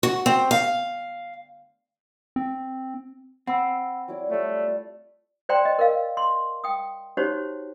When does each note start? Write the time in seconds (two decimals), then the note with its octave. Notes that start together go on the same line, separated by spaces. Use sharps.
0.03 F#4
0.26 C4
0.51 F5
2.36 C4
3.47 C4 F#5 B5 E6
4.08 F#3 E4 D5
4.30 G3 A3 F4 C#5
5.49 C5 D5 G5 A#5 C6
5.65 D#5
5.79 A#4 D#5 F5
6.17 C6
6.64 G5 D#6
7.17 D#4 F#4 G4 C5 C#5